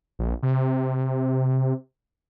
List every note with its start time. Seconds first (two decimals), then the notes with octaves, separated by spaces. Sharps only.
0.19 A#1
0.43 C3